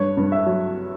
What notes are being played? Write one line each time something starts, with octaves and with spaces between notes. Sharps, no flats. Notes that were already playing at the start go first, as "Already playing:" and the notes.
Already playing: G2 C#5
G2
E5
F#3